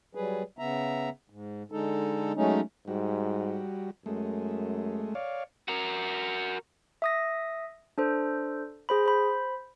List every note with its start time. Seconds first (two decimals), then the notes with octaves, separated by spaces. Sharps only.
0.15 F#3 G3 G#4 B4
0.59 C#3 B3 E5 A#5
1.30 G#2
1.72 D3 G#3 D#4 A4
2.36 F#3 G#3 A3 C#4 D#4
2.88 G#2 G3 F#4
4.06 F#2 G#3 A3
5.15 C#5 D5 F5
5.68 F#4 A#4
7.02 E5 D#6 A#6
7.98 D4 A4 C5
8.89 G#4 C5 B5
9.06 C5 B5